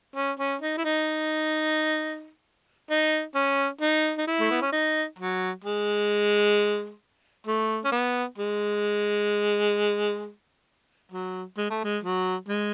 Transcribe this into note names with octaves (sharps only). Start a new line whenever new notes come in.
C#4
C#4
D#4
E4
D#4
D#4
C#4
D#4
D#4
E4
A3
B3
C#4
D#4
F#3
G#3
A3
C#4
B3
G#3
F#3
G#3
A3
G#3
F#3
G#3